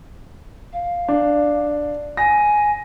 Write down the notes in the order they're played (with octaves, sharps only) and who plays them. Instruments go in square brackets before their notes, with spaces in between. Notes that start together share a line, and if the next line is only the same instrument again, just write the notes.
[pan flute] F5
[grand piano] D4
[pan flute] G#5 [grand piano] A#6